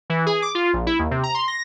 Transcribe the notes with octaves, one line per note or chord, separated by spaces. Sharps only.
E3
G#4
D6
F4
A#1
E4
D#2
C3
A#5
C6
A#6